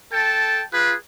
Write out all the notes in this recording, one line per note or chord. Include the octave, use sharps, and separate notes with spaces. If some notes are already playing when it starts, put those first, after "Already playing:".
A4 G5 A5
F4 G#4 B4